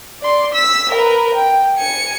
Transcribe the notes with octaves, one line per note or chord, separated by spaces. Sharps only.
D5 C6
E6 B6
A#4 B4
G5
G#5 C#7